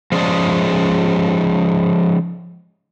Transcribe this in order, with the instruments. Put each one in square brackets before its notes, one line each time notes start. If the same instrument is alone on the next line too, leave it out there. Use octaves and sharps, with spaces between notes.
[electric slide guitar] F3 G#3 C#4 G#4 D5